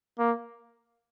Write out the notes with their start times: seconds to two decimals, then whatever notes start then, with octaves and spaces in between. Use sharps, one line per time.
0.19 A#3